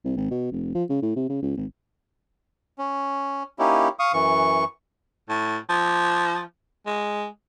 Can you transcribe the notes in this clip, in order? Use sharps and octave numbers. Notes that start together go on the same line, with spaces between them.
C2
G#1
B2
F1
F3
C#3
A2
C3
C#3
C#2
G#1
C#4
A#3 C#4 D#4 E4 G4
F5 C#6 D#6
F#2 E3 C#6
A2
F3
G#3